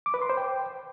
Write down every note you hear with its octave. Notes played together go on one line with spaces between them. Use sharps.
D6
B4
C6
C5
G5